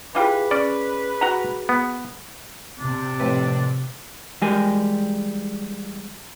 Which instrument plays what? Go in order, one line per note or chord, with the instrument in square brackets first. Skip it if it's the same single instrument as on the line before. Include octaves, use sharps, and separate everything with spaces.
[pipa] E3 F4 G4 [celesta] G#4 D6 [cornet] B4
[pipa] C#4 [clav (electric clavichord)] D5
[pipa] F#4 A#5
[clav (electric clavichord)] B3
[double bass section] C3 [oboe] D4
[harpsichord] F2 A2 B4
[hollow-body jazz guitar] E3 G3 G#3 G4 A#4 G#5